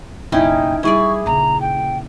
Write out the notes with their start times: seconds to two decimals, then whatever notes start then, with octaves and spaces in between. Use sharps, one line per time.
0.32 F#1 B1 C#4 D#4 E4 G5
0.83 G3 E4 G#4 D5 C#6
1.26 A#1 C#3 A#5
1.60 G5